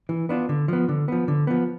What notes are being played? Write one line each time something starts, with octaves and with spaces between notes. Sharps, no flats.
E3
B3 D4 F4
D3
F3 B3
D3
F3 B3
D3
F3 B3